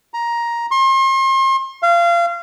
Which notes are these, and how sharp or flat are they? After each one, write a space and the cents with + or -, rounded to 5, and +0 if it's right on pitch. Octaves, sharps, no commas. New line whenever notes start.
A#5 +10
C6 +40
F5 -25